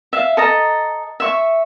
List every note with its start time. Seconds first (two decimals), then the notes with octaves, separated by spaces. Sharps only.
0.13 E5 F5
0.37 A4 D#5 A#5
1.20 E5 C#6